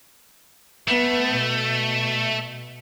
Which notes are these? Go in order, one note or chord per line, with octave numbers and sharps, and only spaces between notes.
A3 B3
B2